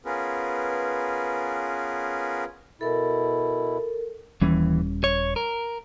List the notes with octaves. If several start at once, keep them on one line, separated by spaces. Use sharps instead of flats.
B3 C#4 F4 G#4 A#4 B4
B2 E4 A4 A#4
D#1 D#2 E3 G3 C#4
C#5
A#4